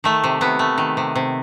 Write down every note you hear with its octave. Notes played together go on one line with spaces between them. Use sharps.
D#3 A3
C3
C3 B3
A3
D#3
C3
C3